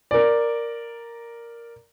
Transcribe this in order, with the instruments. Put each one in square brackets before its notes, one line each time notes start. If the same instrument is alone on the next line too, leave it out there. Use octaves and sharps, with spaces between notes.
[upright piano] A#4 D5